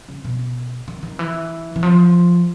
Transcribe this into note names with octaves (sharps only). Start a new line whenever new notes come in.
C#3
B2
D#3
D#3
E3
E3
F3